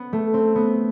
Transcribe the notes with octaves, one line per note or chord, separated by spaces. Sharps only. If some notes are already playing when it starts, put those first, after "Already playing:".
Already playing: B3
A3
C4
B3